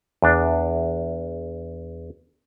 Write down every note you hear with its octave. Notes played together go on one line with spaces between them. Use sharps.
E2 D4